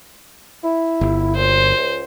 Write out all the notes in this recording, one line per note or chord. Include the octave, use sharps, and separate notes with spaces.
E4
G1
F#2 A#2 C5
C#2